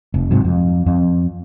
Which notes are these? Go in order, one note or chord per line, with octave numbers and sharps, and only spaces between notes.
F1
G#2 C3 F#3
F2
F2